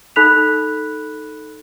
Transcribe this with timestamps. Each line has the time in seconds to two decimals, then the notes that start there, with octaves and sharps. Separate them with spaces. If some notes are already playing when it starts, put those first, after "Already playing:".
0.16 D#4 A4 B5 F#6 B6 F7